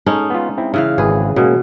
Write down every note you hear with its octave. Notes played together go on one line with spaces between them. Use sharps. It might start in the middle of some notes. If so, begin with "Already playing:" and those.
G#3 C#4 D#4 A4
B3 F4
C4 E4
C#3 E3 E5 F5
G#1 G#4 B4
B2 G#3 A#3 C#4